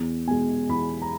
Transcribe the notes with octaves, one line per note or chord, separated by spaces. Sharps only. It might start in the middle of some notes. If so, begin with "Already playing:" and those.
Already playing: E2
B2 G#3 G#5
E2 B5
A#5